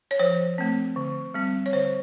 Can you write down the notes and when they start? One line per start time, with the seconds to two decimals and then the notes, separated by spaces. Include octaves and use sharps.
0.11 C#5
0.19 F3 C5
0.58 A3 C4
0.96 D3
1.34 G3 C4
1.66 C#5
1.73 D3 C5